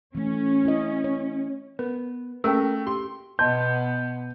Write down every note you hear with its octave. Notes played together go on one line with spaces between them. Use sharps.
E3 A3 C#4
E4 D#5
C#5
B3 A#4
A3 A#3 C#4 G#4 A#4 E5 G5 E6
G4 C6
B2 B3 D#5 A5 C6 G6